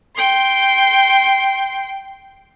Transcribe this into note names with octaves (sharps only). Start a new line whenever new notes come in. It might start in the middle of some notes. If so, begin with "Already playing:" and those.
G5 C6